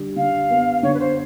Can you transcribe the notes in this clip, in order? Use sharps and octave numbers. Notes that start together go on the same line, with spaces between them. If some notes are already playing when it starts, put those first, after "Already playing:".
Already playing: D3 G3
D3 F5
B3
D3 C#5
B4
C5